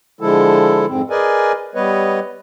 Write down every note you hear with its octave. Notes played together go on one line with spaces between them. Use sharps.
D3 F3 G#3 E4 A4
F2 G#2 C4
G#4 A#4 B4 D5 D#5 G#5
G3 B3 B4 C#5 D#5